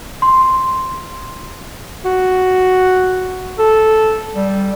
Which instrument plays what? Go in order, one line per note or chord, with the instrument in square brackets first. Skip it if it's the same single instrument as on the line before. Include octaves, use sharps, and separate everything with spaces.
[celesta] C6
[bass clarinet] F#4
A4
G3